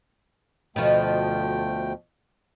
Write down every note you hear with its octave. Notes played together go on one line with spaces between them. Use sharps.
D2 B2 F3 A3 G5